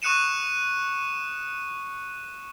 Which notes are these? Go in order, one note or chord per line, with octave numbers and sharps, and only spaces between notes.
C#6 D#6 F#6 C#7 D#7 E7